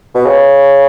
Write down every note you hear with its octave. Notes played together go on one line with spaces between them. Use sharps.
B2
C#3